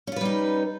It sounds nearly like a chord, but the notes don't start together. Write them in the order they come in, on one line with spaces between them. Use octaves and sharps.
C#4 F4 B4 G3 D#4